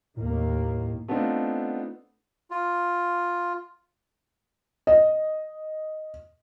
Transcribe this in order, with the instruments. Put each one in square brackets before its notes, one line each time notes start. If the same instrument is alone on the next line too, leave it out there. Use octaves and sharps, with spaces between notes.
[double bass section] D#2 D#3 A#3 [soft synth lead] A2
[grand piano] A3 B3 C4 D4 D#4 F4
[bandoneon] F4
[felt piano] D#5